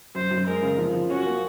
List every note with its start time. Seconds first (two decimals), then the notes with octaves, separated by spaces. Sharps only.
0.15 F#2 C5
0.31 F#2
0.46 G#3 A#4
0.62 C#3
0.78 F3
0.94 F3
1.10 C#4 F#4
1.26 A#3